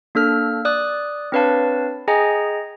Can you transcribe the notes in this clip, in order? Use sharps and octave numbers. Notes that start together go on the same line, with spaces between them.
A#3 D4 A4 F6
D5 D#6 F#6
C4 D4 B4 C#5 F5 A5
G#4 D#5 G5 G#5 A#5